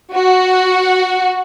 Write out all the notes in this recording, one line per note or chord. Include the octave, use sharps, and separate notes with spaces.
F#4